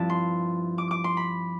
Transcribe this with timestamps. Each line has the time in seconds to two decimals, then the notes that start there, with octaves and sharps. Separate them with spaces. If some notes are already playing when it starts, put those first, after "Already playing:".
Already playing: G2 F3 C4 E4 A5
0.10 C6
0.78 D6
0.91 D6
1.04 C6
1.17 B5